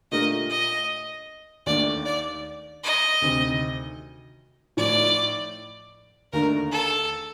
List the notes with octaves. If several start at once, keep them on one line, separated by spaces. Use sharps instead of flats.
A#2 A3 D4 G4 A#4 D#5
D#5
D#2 D#3 A3 D4 D5
D5
D#5
D2 C3 D#3
A2 F3 A3 D#4 D5
D#2 D3 A3 D4 A#4
A4